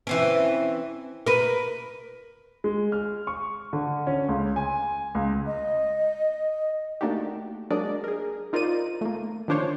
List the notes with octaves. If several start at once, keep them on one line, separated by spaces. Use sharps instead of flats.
E3 C4 C#4
A#4 B4
G#3
F6
C#6
D3
C#4
C#2
G#5
C#2
D#5
A3 A#3 D4 D#4 F#4 G4
F#3 G#3 A#3 D4 D5 D#5
G#4 A#4
D#4 F4 A#4 C5 D5 D#7
A3 A#3
D#3 F3 D4 C5 C#5